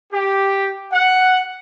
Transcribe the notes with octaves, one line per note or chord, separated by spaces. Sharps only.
G4
F#5